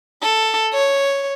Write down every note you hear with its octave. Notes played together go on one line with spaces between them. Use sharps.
A4
C#5